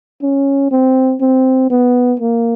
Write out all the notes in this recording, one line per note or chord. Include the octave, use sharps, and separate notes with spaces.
C#4
C4
C4
B3
A#3